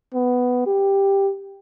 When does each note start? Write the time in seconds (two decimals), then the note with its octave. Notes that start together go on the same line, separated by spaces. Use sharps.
0.14 B3
0.67 G4